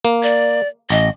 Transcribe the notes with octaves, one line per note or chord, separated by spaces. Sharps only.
A#3
D5
A1 D#5